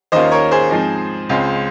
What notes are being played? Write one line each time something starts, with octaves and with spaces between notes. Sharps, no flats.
D#2 D#3 A#3 C#4 F4 C5 D#5
A#4 C#5
G#4 C5
G#2 F3 C4 D#4
C#2 C#3 G#3 C4 F4